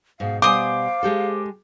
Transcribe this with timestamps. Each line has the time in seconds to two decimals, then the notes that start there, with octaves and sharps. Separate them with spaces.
0.20 G#2 B2 F5
0.42 B2 G3 C5 F5 G#5 D6 D#6
1.03 G#3 G4 A4